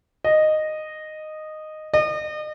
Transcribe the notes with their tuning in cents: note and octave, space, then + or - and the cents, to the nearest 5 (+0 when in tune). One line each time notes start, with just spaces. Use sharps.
D#5 -10
D#5 -35